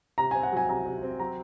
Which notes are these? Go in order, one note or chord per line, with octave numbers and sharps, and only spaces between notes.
C3 A#5
C4 G#5
F#5
F#3 G#5
C3 A#5
C3
C4
F#3 A#5